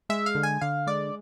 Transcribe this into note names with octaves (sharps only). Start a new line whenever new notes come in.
G#3 E5
F5
D3
G#5
D3 F5
G#3 D5